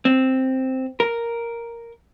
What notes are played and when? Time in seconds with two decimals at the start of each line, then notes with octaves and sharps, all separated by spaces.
0.05 C4
1.00 A#4